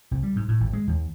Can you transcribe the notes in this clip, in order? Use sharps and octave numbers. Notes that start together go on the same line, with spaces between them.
C2
G3
G#2
A2
G#1
G#3
D#2